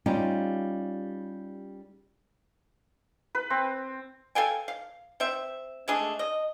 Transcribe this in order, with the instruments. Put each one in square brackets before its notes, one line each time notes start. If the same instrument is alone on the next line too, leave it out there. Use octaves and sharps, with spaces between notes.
[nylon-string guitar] G3 C#4 D#4 F4 G4
[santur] B4
C4
[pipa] A4 F5 G5 G#5
F5
C4 E5
G#3 A3 D4 G#4
D#5